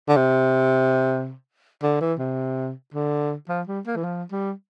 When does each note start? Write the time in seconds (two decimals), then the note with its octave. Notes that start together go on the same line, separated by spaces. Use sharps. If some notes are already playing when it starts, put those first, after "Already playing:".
0.08 D3
0.16 C3
1.83 D3
2.01 E3
2.19 C3
2.94 D3
3.49 F3
3.67 G3
3.86 A#3
3.96 E3
4.04 F3
4.31 G3